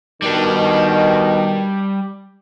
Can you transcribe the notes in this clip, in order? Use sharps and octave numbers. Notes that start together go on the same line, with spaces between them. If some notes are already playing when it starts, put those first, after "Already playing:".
B2 D#3 G3 D4